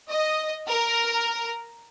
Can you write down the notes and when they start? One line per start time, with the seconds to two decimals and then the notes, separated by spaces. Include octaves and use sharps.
0.10 D#5
0.68 A#4